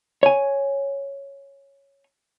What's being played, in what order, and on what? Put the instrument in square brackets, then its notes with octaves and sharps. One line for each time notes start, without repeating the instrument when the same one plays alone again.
[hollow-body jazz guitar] C#5 G#5